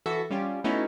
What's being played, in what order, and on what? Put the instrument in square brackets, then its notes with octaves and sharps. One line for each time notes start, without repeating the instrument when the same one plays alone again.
[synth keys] E3 F#4 A4 E5
G3 C#4 F4 G4
A3 B3 C#4 D#4 E4 F#4